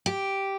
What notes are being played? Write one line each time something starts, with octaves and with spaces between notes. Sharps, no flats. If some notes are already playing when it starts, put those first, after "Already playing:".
G4